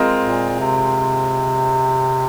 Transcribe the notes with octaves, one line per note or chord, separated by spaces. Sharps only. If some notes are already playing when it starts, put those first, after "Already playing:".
Already playing: G#3 C4 F4 A#4 D#5
A#2
C3